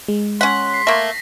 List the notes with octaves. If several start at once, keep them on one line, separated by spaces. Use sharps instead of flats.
G#3
C#4 F#5 C6 B6
C7
A3 A#3 A#6